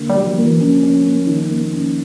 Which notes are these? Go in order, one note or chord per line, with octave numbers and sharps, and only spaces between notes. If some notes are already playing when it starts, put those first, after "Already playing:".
Already playing: D3 A#3
G3
F#3
F3
A#3
E3
F3 C#4
C#4
A#3
D#3
A#3
C#4